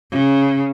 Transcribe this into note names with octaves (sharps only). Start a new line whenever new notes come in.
C#3